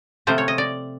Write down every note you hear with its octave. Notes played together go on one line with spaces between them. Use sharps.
C3 F3 A3 C5
C#5
D#5
D5